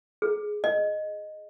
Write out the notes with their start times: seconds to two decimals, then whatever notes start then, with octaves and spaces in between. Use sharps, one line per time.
0.22 G#4
0.64 D#5